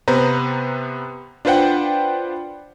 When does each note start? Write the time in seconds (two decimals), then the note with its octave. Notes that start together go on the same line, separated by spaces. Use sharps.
0.08 C3 B3 B4 C5 A#5
1.45 D4 F4 B4 C5 F#5 G5